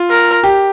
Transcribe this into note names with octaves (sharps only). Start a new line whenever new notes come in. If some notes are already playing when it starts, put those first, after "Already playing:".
Already playing: F4
A#4
G4